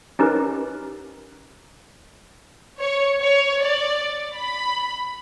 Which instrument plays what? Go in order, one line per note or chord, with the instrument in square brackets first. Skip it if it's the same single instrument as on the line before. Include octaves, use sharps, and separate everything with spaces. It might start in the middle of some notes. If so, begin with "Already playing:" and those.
[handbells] C#4 D#4 G4 A#4 B4
[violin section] C#5
C#5
D5
B5